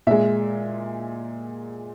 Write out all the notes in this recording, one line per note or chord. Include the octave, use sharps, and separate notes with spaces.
A#2 G#3 E5